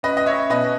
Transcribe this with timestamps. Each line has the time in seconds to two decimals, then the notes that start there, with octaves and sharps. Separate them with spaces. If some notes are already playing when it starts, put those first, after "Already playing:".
0.03 C#4 B4 D#5
0.17 D#5
0.26 C#5 E5
0.50 B2 B4 D#5